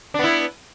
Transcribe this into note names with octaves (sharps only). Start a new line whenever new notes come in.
B3 D4 E4